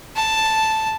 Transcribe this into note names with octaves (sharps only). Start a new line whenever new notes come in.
A5